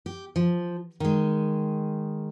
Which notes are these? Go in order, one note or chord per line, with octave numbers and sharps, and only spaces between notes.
G4
F3
D#3 G#3